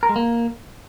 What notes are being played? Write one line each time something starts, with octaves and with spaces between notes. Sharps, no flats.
A#4
G#3
A#3